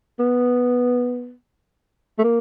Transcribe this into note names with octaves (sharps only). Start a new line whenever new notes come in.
B3
A3
A#3